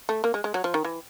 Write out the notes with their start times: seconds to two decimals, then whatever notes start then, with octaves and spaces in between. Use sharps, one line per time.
0.09 A3
0.24 A#3
0.34 G#3
0.44 G#3
0.54 F#3
0.64 F3
0.74 D#3
0.85 E3